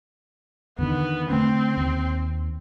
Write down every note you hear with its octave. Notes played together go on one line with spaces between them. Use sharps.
E2 D3 D#3 B3
D3 A3 C4 C#4
D#2